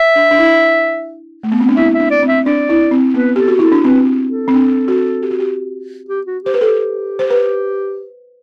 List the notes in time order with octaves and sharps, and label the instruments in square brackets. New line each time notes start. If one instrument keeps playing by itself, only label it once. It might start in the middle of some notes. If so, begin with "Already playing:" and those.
Already playing: [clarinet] E5
[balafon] D4
D4
E4
A3
B3
C4
D4
[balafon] E4 [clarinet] E5
[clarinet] E5
[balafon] D4
[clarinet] D5
[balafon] C4
[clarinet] E5
[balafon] D4 [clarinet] D5
[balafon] E4
C4
[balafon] B3 [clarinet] B4
[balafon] G4 [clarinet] A4
[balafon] F#4
[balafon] E4 [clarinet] A4
[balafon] D4
[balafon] C4 [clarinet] B4
[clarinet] A4
[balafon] C4
D4
F#4
G4
F#4
G4
[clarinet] G4
F#4
[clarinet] G4 [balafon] C5
[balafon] B4
[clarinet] G4 [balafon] A4
[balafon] C5
B4